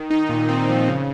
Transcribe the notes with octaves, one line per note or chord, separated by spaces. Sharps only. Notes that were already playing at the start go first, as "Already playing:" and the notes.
Already playing: D#3
D#4
A#2
C4
F3
C#3